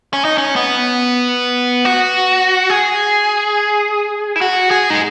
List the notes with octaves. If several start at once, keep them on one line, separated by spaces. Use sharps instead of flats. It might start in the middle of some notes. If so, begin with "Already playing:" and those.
C#4
D#4
C#4
B3
F#4
G#4
E4
F#4
G#4
D#4